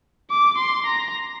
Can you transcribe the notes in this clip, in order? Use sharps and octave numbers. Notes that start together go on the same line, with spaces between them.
D6
C6
A#5